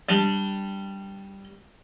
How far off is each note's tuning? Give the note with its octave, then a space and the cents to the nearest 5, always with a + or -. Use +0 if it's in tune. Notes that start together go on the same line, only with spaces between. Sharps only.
G3 +0 D4 +0